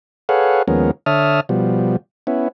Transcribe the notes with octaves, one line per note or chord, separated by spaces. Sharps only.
G#4 A4 B4 C#5 F5 F#5
D#2 F3 G#3 B3 C#4 A#4
D3 C#5 E5 A5 D#6 F6
B2 F3 G3
B3 C#4 E4